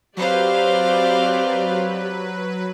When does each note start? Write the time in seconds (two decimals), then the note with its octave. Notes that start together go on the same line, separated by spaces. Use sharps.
0.17 F#3 C4 G4 B4 C5 D5 F5